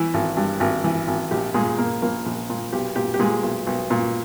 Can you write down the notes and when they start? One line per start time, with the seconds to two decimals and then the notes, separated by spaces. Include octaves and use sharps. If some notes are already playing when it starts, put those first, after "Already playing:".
Already playing: E3 E4
0.14 G#1
0.37 G2
0.60 G#1
0.84 E3
1.07 G#1
1.31 A#1 G4
1.54 A#2 G#3 G#4
1.78 A#2 A#3 A#4
2.02 A#1 A#3 A#4
2.26 A#1
2.50 A#2
2.73 B1 G4
2.96 A#2 G4
3.14 G4
3.19 A#2 G#3 G#4
3.43 B1
3.67 B1
3.90 A#2